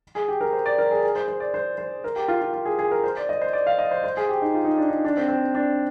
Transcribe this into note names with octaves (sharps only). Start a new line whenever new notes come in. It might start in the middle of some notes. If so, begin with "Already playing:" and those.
G#4
G4
A#4
C5
D5
A#4
G#4
G#4
C5
C5
D5
C5
C5
A#4
G4
F4
F4
F4
G#4
G#4
A#4
C5
D5
D#5
C5
D5
F5
D#5
C5
C5
G#4
G4
D#4
F4
D#4
D4
D#4
D4
C4
C4
D4